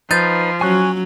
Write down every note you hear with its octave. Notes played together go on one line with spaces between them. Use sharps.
F3 D#4 B4 G6 A6
F#3 C#4 G#5 C#6 F#6